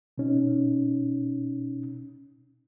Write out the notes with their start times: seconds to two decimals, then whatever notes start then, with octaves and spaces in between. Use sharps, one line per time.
0.18 B2 C#4 D#4